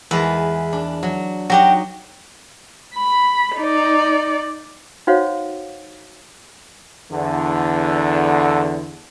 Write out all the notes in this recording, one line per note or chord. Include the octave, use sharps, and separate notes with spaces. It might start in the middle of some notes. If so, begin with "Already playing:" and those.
E2 G#3 B4 A5
D4
F#3
F#3 D#4 F#4 G4 F#5
B5
D#4 D5
D#4 F#4 C5 C#5 F5 F#5
E2 D3